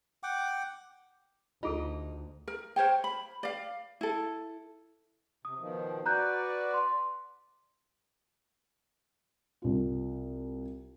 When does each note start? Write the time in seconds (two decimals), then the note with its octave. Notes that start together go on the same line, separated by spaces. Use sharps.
0.23 F#5 G5 D6
1.63 D2 D#4 F4 G#4 A4
2.48 A#4
2.76 A#4 C5 C#5 G5
3.04 B5
3.43 D5 F5
4.01 E4 A4
5.45 C3 D#6
5.59 B2 D#3 F3
6.06 F#4 B4 D5 A#5 F#6 G6
6.74 C6
9.62 C2 F4